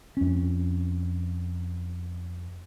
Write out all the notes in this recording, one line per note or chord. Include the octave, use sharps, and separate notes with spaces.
F2 C#4